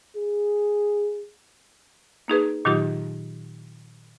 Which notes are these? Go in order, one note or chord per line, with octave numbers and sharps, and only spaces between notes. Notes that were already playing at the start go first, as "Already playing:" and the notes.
G#4
A#3 D#4 G#4 B4
A#2 D#3 F#3 D#4 F4 G4